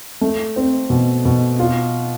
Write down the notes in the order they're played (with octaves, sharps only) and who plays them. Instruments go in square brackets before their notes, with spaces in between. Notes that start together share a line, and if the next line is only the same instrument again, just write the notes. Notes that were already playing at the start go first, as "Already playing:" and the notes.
[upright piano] A3
C4
B2
B2
F4